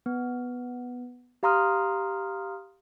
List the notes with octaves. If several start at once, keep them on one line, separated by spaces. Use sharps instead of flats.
B3
G4 F5 A#5 C6 D#6 F6